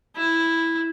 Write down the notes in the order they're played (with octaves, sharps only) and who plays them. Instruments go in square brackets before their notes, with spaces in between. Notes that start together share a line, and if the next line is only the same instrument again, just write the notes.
[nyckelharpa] E4